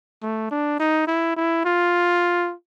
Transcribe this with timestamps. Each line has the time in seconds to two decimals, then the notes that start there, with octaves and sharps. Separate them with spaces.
0.22 A3
0.51 D4
0.80 D#4
1.07 E4
1.36 E4
1.65 F4